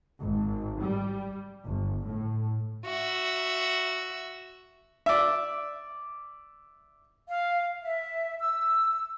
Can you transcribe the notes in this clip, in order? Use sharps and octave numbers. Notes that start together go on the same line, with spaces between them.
G#1
G3
G1
A2
F#4 E5
D5 E5
F5
E5
E6